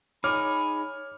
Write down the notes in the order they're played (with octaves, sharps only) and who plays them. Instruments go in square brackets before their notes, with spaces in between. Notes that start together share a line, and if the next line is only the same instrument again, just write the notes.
[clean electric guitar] D#4 G#4 [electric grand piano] C#5 D6 [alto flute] B5 [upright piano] F6